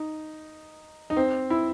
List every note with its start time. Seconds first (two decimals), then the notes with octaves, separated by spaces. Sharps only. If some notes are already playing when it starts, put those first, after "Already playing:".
Already playing: D#4
1.10 D#4
1.17 C4
1.50 E4